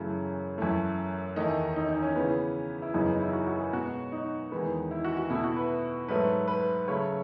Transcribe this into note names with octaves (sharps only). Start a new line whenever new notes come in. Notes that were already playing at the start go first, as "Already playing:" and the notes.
Already playing: F#2 C#3 E3 A3
F#2 E3 A3
E2 D#3 A3 D#4
D#4
D#4
C#4
C#3 E3 B3
E4
F#2 C#3 E3 B3 D#4
D#4
E4
F#4
F#4
G#4
B2 G#3 B3 F#4
D#4
E2 D#3 G#3 B3
E4
F#4
F#4
B2 A3 E4
F#4
B4
G#2 F#3 A3 B4
B4
C#3 F#3 A3 C#5